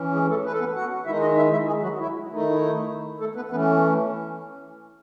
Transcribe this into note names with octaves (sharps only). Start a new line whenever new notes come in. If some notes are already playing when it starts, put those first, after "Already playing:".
Already playing: E3 C#4
G#3 G#4
A3 A4
B4
A4
B3 B4
F#4 F#5
D#3 G#3 D#4 E4 E5
D#4 D#5
E4 E5
E4 E5
G#3 G#4
F#3 F#4
E4
D#3 A3 D#4
E4
E4
A3 A4
B3 B4
E3 A3 B3 C#4 B4